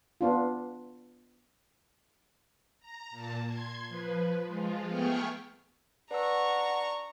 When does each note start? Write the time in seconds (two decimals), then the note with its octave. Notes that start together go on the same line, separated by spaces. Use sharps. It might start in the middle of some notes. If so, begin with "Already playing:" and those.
0.21 B3 D4 F4
2.80 A#5
3.11 A#2 A5
3.46 C6 G#6
3.88 F3 B4
4.45 F3 G#3 F4
4.87 A3 B3 G#4 G5 C#6 F6
6.11 D4 B4 F#5 A#5 C#6 E6